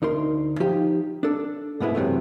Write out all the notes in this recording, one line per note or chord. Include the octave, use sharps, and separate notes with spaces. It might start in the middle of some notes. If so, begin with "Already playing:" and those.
D2 D#4 A#4 C6
F3 D#4 F4 G4
D4 A4
G#2 B2 G#3 B3 E4
F#2 C3 E3 A3